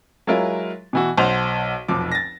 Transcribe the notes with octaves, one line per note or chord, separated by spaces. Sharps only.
F#3 G#3 E4 F4 A#4
B2 E3 F#4
B1 C5 F#5 A5 F7
F1 B1 F3 D6
A6 A#6